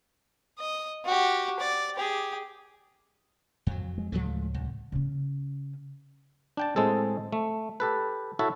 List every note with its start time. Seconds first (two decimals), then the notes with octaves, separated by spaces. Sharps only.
0.59 D#5
1.06 F#4 G4
1.60 D5
1.96 G4 G#4
3.67 F2 F#3
3.98 G#3
4.12 D2 A2 C#3 F3 G#3 A3
4.54 C2
4.92 C#3 C#4
6.57 D4 G5 A5
6.76 A2 G#3 C4 G#4 A4
7.33 A3
7.80 G4 A4 B4
8.39 E4 F#4 A4 C#5 E5